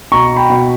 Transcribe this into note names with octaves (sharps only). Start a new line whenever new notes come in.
B2 A#5 C#6
G5 B5
B2